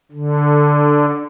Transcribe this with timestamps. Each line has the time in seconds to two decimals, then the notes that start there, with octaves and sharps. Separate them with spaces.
0.12 D3